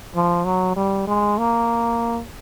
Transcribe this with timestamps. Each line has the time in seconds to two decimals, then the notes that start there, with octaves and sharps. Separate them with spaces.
0.15 F3
0.45 F#3
0.76 G3
1.07 G#3
1.38 A#3